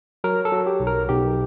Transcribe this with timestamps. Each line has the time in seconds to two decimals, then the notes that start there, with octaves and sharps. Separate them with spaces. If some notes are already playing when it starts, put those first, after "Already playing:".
0.24 F#3 A#4
0.45 A4
0.52 F#3
0.67 G4
0.80 B1
0.87 A#4
1.09 B1 G4